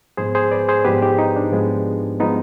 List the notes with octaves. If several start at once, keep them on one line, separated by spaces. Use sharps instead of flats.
G#2 F3 G#3 B3 G#4 C5
G#4 C5
B4 D5
G#4 C5
G#2 F3 G#3 B3 G4 B4
D#4 G4
D#4
D4
G#2 F3 G#3 B3
F3 G#3 B3 D#4